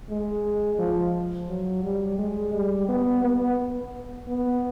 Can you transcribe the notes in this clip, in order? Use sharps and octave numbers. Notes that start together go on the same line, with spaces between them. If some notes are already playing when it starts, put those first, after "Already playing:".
G#3
F3
F#3
G3
G#3
G3
B3
B3
B3